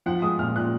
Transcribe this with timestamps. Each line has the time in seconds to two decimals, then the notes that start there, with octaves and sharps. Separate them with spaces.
0.06 F3 F#5
0.22 G#3 D#6
0.39 A#2 F6
0.56 A#2 F#6